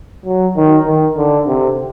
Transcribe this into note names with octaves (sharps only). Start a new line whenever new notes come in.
F#3
D#3
D#3
D3
C3